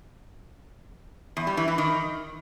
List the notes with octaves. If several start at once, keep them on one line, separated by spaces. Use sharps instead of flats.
E2
G3
E3
E3
D#3